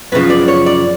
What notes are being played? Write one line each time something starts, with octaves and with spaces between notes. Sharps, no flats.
F#2 C#3 F3 B4
D5
C#5
D5